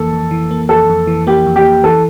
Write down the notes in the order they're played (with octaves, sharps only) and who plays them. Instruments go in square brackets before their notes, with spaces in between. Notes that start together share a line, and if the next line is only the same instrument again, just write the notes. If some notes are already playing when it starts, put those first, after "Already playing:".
Already playing: [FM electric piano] F2 E3 A#3 [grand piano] A4
[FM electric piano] F2
E3
A#3
[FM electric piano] F2 [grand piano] A4
[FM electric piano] F2
E3
[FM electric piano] A#3 [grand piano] G4
[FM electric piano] F2
[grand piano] G4
[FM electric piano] F2
[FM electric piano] E3 [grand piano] A4